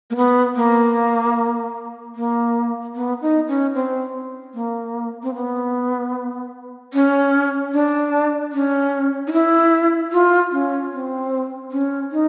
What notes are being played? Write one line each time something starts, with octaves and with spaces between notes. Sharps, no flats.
A#3
B3
A#3
A#3
B3
D#4
C#4
C4
A#3
C4
B3
C#4
D4
C#4
D#4
E4
F4
C#4
C4
C#4
D#4